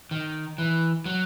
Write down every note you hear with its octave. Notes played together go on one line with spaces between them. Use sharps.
D#3
E3
F#3